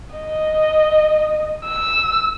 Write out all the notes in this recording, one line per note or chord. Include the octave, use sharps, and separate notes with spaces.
D#5
E6